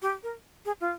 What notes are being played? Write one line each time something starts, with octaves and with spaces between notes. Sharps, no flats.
G4
A#4
G#4
F4